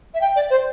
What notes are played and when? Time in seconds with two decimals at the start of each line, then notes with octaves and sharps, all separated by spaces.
0.14 E5
0.21 G5
0.36 D5
0.50 C5